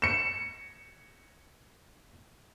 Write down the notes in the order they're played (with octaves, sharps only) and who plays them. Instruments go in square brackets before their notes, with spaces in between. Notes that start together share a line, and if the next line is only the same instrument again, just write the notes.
[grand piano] C#7 E7